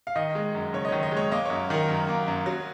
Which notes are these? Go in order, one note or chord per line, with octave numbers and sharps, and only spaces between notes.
F5
D#3 D#5
G#3
F#2
F#1 C#5
D#5
C#5
D#3
D#5
G#3 C#5
A#3 D#5
C#5
F#2
D#3 A#4
F#2
A#3
F#2
F#3